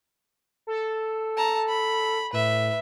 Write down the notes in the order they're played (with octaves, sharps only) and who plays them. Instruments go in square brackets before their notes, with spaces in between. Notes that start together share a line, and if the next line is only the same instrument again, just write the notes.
[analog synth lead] A4
[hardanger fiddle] A5 A#5
B5
[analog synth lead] A2 [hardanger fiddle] B4 E5